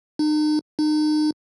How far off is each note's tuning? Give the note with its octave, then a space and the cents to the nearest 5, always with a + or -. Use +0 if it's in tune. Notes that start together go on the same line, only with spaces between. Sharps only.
D#4 -40
D#4 -35